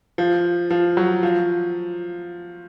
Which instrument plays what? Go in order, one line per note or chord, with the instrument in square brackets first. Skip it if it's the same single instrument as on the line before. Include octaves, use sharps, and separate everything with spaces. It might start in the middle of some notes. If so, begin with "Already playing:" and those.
[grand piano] F3
F3
F#3
F3